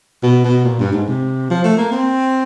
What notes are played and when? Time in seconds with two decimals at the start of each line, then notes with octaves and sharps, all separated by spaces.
0.23 B2
0.44 B2
0.65 A#2
0.80 G2
0.93 G#2
1.08 C3
1.50 F3
1.64 A3
1.78 A#3
1.92 C4